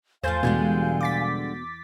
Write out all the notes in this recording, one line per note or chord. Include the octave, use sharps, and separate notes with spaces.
E2 F3 A3 C5 F5 G#5 G6 A6
B2 D3 E3 G3 G#3 G6
D6 A6 B6